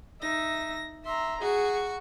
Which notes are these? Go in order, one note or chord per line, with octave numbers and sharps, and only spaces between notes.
D#4 E5 A#6
E5 A#5 C6
F#4 G#4 C#6